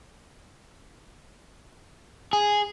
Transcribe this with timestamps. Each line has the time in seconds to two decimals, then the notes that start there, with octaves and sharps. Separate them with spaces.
2.33 G#4